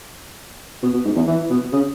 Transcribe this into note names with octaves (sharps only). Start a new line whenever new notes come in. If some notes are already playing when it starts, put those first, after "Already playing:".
B2
B2
G#2
E2
E3
B2
C#3